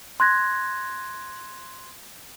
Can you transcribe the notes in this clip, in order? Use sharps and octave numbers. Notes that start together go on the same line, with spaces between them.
C6 F#6 G#6 A#6